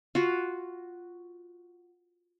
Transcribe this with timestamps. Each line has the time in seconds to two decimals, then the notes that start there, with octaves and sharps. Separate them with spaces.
0.15 F4 F#4